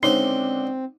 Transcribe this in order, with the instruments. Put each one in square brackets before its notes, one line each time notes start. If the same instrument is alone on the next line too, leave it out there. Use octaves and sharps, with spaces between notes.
[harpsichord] C#2 D3 C5 [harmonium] C4 [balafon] D#4 [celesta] C#5 G7